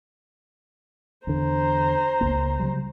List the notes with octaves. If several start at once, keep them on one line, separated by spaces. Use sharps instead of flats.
E2 D3 C5 A#5
C#2 F#2 A#3
C#3 F#3 G3